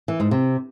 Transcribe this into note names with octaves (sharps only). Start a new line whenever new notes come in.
E3
G#2
C3